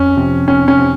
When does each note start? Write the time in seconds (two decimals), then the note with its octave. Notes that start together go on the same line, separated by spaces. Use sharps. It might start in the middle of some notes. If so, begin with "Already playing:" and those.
Already playing: F2 C#4
0.17 C3 F3 C4
0.48 F2 C#4
0.68 C#4
0.78 C3 F3 C4